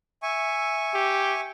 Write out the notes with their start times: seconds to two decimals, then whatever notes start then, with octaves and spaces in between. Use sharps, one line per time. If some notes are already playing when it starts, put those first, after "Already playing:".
0.23 E5 G#5 C#6
0.94 G4